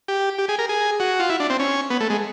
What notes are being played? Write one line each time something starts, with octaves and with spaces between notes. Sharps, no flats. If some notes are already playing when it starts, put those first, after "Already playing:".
G4
G4
G#4
A#4
G#4
F#4
F4
E4
D4
C4
C#4
B3
A3
G#3